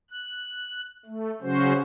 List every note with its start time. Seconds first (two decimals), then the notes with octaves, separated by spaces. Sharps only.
0.11 F#6
1.06 A3
1.42 C#3 F#3 C#4 F#4 C5